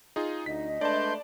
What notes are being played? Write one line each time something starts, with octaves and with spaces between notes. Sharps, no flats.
D#4 F4 G#4
D2 D#4 D#5 B6
G#3 A3 D4 B4 D5 A5 C6 G6